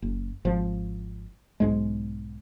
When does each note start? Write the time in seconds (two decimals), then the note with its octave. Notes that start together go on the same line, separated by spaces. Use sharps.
0.02 F#1
0.45 G#1 F3
1.60 B1 G#2 G#3